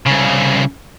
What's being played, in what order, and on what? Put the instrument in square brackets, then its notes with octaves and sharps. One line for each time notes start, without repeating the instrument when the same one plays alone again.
[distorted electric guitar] C2 C#3